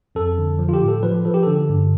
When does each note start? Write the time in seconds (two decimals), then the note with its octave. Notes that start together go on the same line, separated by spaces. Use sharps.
0.15 F2 A4
0.38 D3
0.59 F3
0.69 F4
0.74 G4
0.82 A2
0.88 A4
1.03 F3 B4
1.25 F3 A4
1.34 G4
1.43 D3 A4
1.69 G2